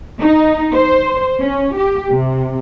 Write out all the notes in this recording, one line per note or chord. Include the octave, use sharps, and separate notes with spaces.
D#4
C5
C#4
G4
C3